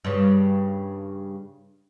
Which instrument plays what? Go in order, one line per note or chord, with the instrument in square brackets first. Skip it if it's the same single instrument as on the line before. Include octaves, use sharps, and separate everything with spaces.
[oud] G2 C#3